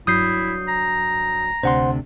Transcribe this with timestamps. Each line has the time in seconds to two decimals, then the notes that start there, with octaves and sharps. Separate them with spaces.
0.07 G2 F#3 E4 D#6 G6 C7
0.68 A#5
1.63 D2 C3 D4 C5 F#5 C6